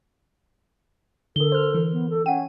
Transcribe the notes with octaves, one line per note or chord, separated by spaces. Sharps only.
D3 A4 A#4 G7
C5 F6
E3
B3
A4
C#4 F#5 G5 D#7